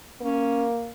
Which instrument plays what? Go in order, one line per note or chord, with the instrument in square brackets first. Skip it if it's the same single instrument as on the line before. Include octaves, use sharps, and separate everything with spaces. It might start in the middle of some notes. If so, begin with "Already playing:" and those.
[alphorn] A#3 [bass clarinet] C#4